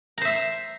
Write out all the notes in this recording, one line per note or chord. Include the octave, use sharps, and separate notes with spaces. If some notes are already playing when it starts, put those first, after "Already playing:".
C5 E5 A#5